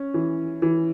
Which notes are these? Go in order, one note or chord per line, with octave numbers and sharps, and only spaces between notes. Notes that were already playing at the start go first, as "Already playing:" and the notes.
Already playing: C#4
E3
E3